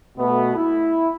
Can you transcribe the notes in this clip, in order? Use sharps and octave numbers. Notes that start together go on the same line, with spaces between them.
B2 A3 B3
E4